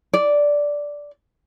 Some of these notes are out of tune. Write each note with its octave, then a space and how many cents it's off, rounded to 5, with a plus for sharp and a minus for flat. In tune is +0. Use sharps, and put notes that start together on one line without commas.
D5 -5